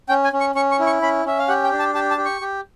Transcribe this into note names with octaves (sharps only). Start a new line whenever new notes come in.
C#4 G5
G#5
C#4
C#6
C#4 C#6
C#6
E4
C#6
C#4 B5
C#4 E5
F5
G4 F#5
G5
D4
A5
G4 A5
A5
G4
C#6
G4